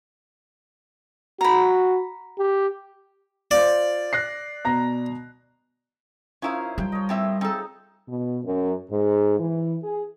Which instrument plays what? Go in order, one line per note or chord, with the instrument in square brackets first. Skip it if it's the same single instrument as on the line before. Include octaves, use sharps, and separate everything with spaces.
[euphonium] F#4 [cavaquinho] A#5 B5
[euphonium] G4
[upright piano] F4 C5 [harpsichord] D5
[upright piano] F#6 A#6 C7
B2 A#5 A#6
[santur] F3 D#4 A#4 [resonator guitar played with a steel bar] C#4 E4 F5
[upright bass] G3 [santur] G5
[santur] C#5 D#5
[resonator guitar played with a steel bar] A2 C4 E5
[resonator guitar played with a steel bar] C4 A4 [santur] D#4 G#4
[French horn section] B2
F#2
G#2
E3
G#4